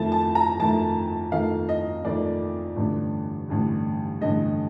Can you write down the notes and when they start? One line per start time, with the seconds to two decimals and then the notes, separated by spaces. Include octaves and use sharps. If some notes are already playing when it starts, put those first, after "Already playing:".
Already playing: F2 D#3 A3 A5
0.12 A5
0.35 A#5
0.60 F2 D#3 A3 A5
1.32 F2 D#3 A3 F5
1.69 D#5
2.05 F2 D#3 A3 D5
2.76 A1 G2 D3
3.48 A1 G2 D3
4.21 A1 G2 D3 D#5